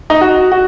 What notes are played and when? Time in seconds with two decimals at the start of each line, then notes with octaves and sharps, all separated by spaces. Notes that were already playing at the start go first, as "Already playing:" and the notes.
0.10 D#4
0.21 F#4
0.52 F#4